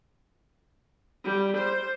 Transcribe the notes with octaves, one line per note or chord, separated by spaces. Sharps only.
G3
C5